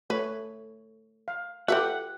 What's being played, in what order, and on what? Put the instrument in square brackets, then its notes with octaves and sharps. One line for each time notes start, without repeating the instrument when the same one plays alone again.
[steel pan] A3 C#5 [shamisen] B4
[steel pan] F5
[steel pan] F4 G4 G5 [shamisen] A4 B4 E5 [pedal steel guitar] F#5